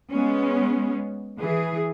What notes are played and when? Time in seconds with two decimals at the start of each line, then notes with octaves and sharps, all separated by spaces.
0.13 G#3 B3 C#4
1.39 E3 G#4